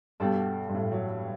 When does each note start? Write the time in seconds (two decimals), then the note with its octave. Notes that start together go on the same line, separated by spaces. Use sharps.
0.20 G2 B2 G3 D4 A4
0.69 G2
0.75 A2
0.92 F#3